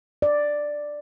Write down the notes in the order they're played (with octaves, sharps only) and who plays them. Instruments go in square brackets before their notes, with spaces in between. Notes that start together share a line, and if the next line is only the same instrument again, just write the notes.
[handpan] D5